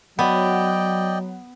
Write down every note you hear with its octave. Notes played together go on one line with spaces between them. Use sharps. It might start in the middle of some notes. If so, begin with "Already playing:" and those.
F#3 B3 D5 D#5 G5